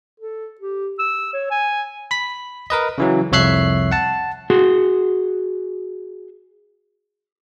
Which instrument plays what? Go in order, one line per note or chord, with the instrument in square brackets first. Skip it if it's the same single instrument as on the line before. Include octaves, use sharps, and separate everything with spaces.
[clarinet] A4
G4
E6
C#5
G#5
[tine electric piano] B5 B6
A#4 B4 D#5
C#3 E3 F#3
C2 F2 C#5 E5 F#6 C7
F#5 A5
[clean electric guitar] F#4 G#4 F#5 C6